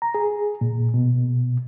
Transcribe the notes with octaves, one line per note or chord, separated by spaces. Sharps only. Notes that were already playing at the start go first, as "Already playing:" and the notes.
A#5
G#4
A#2
B2